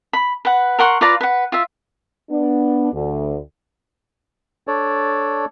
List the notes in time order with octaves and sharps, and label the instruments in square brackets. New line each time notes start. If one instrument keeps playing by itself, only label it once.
[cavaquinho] B5
B4 F#5
A#4 F#5 C6 C#6
F4 B4 D5 A#5
B4 F#5
F4 E5
[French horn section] B3 D4
D2
[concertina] D4 A4 C#5 D5